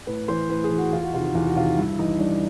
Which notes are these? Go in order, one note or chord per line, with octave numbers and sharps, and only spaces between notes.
A2 B4
E3 C5
A2 B4
G#4
E3
F#4
E2 F4
F#4
C3 D#3 F4
F#4
E2 F4
F#4
C3 D#3 F4
G2 E4
E3 D#4
G2 D4